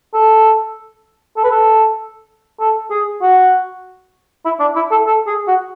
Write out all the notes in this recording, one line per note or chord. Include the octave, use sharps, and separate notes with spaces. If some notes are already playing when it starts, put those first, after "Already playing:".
A4
A4
B4
A4
A4
G#4
F#4
E4
D4
E4
A4
A4
G#4
F#4